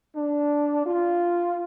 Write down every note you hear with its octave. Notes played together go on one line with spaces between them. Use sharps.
D4
F4